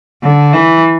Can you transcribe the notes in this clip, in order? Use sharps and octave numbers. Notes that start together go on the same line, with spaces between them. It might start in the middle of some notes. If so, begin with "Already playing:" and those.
D3
E3